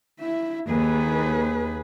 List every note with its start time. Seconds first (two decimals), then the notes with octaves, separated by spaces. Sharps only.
0.20 E4 E5
0.70 D#2 G#4 B4